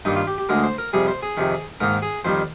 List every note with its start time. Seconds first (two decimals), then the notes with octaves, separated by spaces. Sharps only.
0.05 G2 D#3 A#3 D#4
0.16 F4
0.27 G4
0.38 G4
0.49 D2 D3 G#3 A#4
0.64 C5
0.78 A#4
0.93 F2 C3 G3 G#4
1.08 C5
1.22 G#4
1.37 F2 C3 D#3
1.80 G#2 D#3 A#3 A#4
2.02 G#4
2.24 F2 D#3 G3 C5